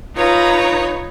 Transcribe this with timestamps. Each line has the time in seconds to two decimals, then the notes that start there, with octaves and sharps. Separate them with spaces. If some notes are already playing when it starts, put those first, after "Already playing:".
0.16 D#4 F4 B4 C#5 A#5